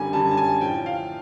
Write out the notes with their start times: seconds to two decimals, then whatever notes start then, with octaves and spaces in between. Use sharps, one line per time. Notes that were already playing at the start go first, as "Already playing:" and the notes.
Already playing: F#2 D3 G3 G#5
0.13 F#2 D3 G3 A5
0.31 A5
0.37 G#5
0.61 A2 F3 G5
0.86 F5